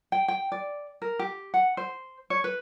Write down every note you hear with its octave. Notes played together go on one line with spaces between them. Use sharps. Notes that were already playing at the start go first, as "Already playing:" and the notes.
G5
G5
D5
A#4
G4
F#5
C5
C#5
B4